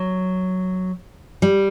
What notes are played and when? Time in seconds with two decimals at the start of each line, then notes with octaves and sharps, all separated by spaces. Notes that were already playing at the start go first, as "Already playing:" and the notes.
Already playing: F#3
1.42 G3